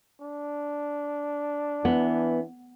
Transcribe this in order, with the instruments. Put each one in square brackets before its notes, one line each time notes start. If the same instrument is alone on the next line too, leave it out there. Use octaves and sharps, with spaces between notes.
[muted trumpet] D4
[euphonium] E3 [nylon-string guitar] B3